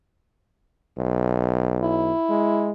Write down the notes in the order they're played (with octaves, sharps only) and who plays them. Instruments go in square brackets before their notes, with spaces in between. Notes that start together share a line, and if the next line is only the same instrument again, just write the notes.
[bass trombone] B1
[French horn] E4
[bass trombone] G#3